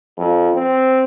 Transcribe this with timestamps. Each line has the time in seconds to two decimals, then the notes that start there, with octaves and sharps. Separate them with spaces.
0.18 F2
0.55 C4